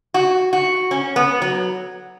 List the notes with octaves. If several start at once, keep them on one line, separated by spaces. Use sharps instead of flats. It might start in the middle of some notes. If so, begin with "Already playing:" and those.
F#4
F#4
C#4
B3
F#3